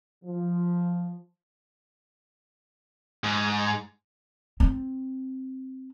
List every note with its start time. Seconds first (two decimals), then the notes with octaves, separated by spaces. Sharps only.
0.24 F3
3.24 G#2
4.60 C4